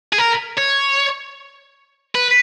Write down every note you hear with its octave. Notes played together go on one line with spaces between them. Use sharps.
G#4
A#4
C#5
B4